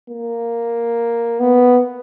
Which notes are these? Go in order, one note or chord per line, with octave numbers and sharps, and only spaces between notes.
A#3
B3